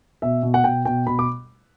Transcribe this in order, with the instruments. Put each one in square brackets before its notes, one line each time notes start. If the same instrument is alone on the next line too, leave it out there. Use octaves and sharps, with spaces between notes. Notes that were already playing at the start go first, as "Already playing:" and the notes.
[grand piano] B2 E5
B2
F#5
B2 G5
B2 G5
B2 B5
D6